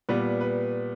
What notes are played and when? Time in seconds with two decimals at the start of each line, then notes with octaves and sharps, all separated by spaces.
0.09 A#2 G3 B3 B4
0.41 B4